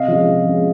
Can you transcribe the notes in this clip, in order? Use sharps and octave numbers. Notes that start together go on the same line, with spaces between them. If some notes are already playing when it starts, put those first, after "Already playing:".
Already playing: C3 D#5 F5
F3 G#3 C#4
C3
F3 G#3 C#4